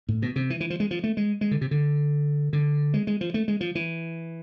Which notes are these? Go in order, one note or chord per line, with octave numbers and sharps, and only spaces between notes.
A2
B2
C3
E3
E3
F3
G#3
F3
A3
G#3
G#3
D3
C3
D3
D3
G#3
G#3
F3
A3
G#3
F3
E3